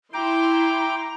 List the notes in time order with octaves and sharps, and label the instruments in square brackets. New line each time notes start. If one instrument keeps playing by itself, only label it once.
[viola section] E4 C6 [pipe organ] G5 D6 [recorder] A#5